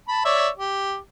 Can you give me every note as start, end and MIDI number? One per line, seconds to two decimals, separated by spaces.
0.08 0.24 81
0.08 0.24 83
0.25 0.49 73
0.25 0.49 74
0.25 0.49 76
0.58 0.97 67